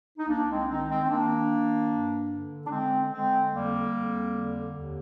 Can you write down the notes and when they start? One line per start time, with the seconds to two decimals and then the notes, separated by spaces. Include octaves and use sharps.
0.18 D#4
0.28 C2 A#3 D4
0.48 G#3 C4
0.68 D#3 C4 D#4
0.88 G#3 C4
1.02 C4
1.09 D#3 A#3 D4
1.49 D#3
1.90 G2
2.30 D3
2.65 D4
2.70 D3 G#3 C4
3.10 D3 G#3 C4
3.51 F2 G3 A#3
3.91 F2
4.31 D3
4.73 D#2